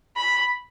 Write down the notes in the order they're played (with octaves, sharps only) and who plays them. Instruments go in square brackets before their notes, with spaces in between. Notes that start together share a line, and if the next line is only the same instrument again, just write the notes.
[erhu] B5